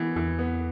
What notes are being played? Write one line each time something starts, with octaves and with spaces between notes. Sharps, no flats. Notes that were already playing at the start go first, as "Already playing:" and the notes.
Already playing: E3 B3
E2 E3
B3